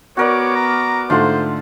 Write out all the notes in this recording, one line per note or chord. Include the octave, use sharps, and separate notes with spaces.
B3 F#4 A#4 C#5 D5 D6
A#5
G#2 D3 A3 F4 C5 F#5 A5